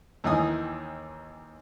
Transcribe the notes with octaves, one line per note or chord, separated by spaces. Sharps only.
D#2 D#3 E3 D#4 G#5 D#6